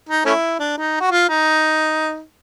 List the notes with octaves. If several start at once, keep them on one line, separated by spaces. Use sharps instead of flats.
D#4
A3 C#4 E4
D4
D#4
F#4
F4
D#4